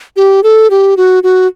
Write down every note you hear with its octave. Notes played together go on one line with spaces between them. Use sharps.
G4
A4
G4
F#4
F#4